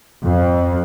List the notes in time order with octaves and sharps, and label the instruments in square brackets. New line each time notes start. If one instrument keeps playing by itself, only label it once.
[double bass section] F2